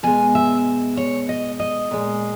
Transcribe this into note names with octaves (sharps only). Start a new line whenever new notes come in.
B2 G#3 G#5
E5
C#5
D#5
D#5
A#2 G#3